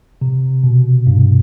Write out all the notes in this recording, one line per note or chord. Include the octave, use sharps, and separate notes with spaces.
C3
B2
G2